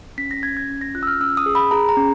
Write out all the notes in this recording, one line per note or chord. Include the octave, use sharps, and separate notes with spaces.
C#4 B6
A#6
C#4 G#6
G#6
C#4
A#6
F4 F#6
E6
F6
C#4 E6
D#6
G#4
B5
G#4 A#5
A#5
C#4